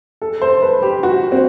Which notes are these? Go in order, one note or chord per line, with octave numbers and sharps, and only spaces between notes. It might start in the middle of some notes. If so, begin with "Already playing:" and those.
A4
C5
B4
G4
F#4
C4